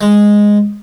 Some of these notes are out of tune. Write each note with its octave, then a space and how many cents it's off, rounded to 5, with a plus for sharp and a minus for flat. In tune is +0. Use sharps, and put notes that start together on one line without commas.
G#3 -5